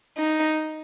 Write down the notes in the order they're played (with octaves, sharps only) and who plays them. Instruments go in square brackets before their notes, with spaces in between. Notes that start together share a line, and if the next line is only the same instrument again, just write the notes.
[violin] D#4